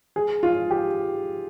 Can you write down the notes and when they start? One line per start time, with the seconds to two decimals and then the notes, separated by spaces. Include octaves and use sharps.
0.16 G#4
0.43 F4
0.71 G4